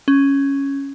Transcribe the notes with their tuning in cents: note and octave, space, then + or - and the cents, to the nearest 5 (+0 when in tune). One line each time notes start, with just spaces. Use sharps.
C#4 +0